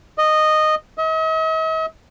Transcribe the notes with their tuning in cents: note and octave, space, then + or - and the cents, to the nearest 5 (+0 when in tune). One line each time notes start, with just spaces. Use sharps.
D#5 -10
D#5 +45